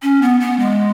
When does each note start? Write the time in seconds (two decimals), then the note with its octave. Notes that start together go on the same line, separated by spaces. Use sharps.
0.03 C#4
0.22 B3
0.41 B3
0.59 G#3